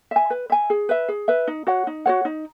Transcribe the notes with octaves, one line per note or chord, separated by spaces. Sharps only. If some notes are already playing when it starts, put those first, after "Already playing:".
E5 G#5
B4
E5 G#5
G#4
B4 E5
G#4
B4 E5
D#4
F#4 C#5 F#5
D#4
F#4 C#5 F#5
D#4